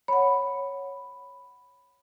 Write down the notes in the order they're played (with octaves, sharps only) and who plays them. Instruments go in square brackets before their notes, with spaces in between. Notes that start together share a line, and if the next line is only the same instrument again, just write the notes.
[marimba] C#5 F#5 [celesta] B5